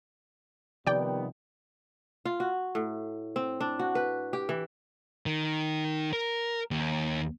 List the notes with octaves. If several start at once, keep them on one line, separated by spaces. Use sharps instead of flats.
C3 D#3 F3 G3 B3 D5 G5
F4
F#4
A2
C4
D4
F#4
B4
G4
E3
D#3
A#4
D#2